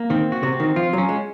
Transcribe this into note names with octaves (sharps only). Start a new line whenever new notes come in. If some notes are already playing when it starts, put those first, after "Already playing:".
Already playing: A#3
D#3 C4
F#4
C3
C4
D#3
F3 F4
F#3 C#4
G#3